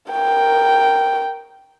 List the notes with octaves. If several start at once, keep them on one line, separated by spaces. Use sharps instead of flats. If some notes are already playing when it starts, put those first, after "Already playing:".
A#4 G5